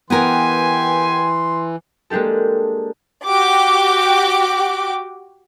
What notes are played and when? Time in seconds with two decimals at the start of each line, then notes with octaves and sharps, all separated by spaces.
0.10 E3 B3 G4 A#4 G5 G#5 C6
2.10 G#3 A#3 D4 G4 A4
3.26 F#4 G4 G5 D6